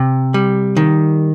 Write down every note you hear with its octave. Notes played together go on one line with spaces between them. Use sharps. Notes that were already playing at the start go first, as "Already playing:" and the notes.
Already playing: C3
G3
D#3